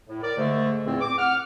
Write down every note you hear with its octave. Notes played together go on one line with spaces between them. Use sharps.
A2
A#4 D5
G#2 D3 A3
E2 A#2 C4
D6
F#5 F6